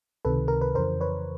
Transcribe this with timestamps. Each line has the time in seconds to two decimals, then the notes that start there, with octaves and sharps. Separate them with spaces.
0.25 C#2 C3 D#3 A4 B4
0.48 A#4
0.61 B4
0.75 F2 C#3 E3 A#4 C5
1.01 B4 C#5